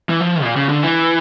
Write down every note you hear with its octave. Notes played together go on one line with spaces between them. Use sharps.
E3
F3
A#2
C#3
D3
E3